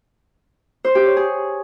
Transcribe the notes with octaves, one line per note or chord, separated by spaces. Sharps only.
C5
G4
C#5
G#4